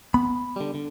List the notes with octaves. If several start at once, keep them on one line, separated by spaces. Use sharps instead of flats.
B3 B5
D3 G3
D3